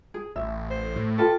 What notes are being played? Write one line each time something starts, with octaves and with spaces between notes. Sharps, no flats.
G#4
A1 E5
C5
A2
F4 G4 A4 B4